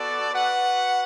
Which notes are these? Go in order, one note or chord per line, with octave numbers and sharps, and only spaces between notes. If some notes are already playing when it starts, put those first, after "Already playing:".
Already playing: B3 F#4 A4 D5
F#4 B4 F#5